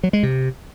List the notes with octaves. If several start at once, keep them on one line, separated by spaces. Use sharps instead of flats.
F#3
G#3
C3